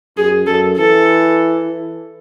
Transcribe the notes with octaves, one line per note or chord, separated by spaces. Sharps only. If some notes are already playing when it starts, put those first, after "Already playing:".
F#2 G#4
F#2 A4
E3 A4